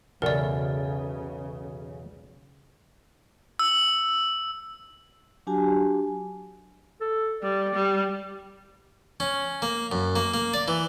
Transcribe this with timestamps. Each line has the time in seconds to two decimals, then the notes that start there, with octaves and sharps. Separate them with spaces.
0.22 B1 E2 C#3 A4 A#4 D5
3.59 E6
5.47 F#3 D4 F#4 G4 G#5 A5
7.01 A4
7.43 G3 D5
7.74 G3
9.20 C#4
9.62 A#3
9.92 F#2
10.16 A#3
10.34 A#3
10.54 D5
10.68 E3